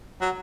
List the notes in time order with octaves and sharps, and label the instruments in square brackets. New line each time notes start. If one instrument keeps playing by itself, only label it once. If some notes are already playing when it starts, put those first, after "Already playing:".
[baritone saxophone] F#3